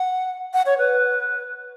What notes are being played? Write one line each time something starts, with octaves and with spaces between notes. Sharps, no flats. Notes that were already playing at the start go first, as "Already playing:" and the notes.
Already playing: F#5
F#5
C#5
B4